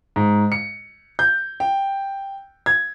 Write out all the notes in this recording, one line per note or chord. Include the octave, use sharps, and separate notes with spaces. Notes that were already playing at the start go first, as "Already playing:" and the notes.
G#2
C#7
G6
G5
G#6